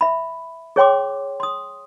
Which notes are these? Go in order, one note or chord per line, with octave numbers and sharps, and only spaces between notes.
E5 B5
G#4 C#5 G5 C6 D6
C6 D#6